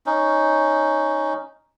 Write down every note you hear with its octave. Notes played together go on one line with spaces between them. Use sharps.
C#4 D#4